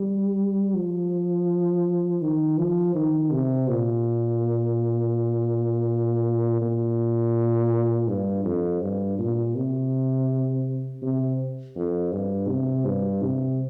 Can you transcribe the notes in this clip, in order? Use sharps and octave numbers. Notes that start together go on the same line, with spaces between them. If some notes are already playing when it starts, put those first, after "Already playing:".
Already playing: G3
F3
D#3
F3
D#3
C3
A#2
A#2
G2
F2
G2
A#2
C3
C3
F2
G2
C3
G2
C3